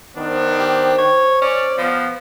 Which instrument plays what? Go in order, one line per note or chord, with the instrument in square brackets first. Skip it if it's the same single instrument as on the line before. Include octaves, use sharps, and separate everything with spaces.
[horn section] D#3 B3 D4 [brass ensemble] C5
[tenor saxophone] G4
C#5
[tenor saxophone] C#4 [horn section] D5
[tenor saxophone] F3 [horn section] B3